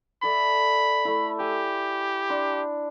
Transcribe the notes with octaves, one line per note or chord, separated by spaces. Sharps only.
A4 D5 E5 B5
A3 E4
G4 G#5
D4 B5 C6